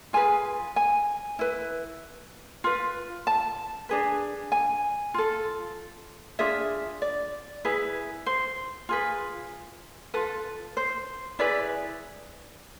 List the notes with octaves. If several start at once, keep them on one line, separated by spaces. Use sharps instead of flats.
F4 G#4 B4 G#5
G#5
E4 B4
F4 B4
A5
D4 G#4 B4
G#5
F4 A4
D4 F4 G#4 E5
D5
E4 G#4 B4
C5
F4 G#4 B4
F4 A4 B4
C5
E4 G#4 B4 D5